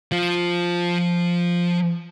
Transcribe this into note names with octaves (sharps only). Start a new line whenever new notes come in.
F3 F4